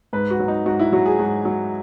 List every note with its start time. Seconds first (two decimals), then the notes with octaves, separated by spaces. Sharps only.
0.13 G#2 B4
0.30 F#4
0.39 F#3
0.48 D#4
0.66 G#2 F#4
0.79 E4
0.92 F#3 F#4
1.06 G#4
1.19 G#2 F#4
1.45 F#3